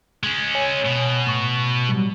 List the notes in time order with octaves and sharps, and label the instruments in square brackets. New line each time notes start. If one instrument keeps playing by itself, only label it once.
[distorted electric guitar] G#3 C#4
[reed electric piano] C#5 G#5
[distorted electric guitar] B2
[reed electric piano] A2 C#6
F#3 G3